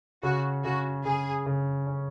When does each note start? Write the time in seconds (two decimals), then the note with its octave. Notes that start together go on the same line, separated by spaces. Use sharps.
0.23 C#3 F#4
0.64 C#3 F#4
1.05 C#3 G#4
1.46 C#3
1.87 C#4